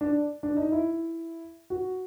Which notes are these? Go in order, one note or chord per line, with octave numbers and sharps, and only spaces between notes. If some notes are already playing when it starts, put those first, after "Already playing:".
D4
D4
D#4
E4
F#4